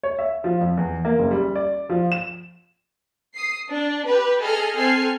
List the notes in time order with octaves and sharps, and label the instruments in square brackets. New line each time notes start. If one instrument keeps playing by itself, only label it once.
[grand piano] C#5
E5
F3
F2
E2
A#3
F#1
G3
D5
F3
E7
[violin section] D#6 C7
D4
G4 B4
G#4 A4 D#5 F6
C4 A4 G#5 F6 C7